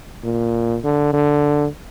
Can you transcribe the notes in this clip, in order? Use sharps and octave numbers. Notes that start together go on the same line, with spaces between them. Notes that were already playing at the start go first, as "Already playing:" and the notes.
A#2
D3
D3